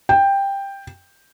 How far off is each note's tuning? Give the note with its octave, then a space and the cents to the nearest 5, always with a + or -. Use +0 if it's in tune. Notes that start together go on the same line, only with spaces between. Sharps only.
G5 +10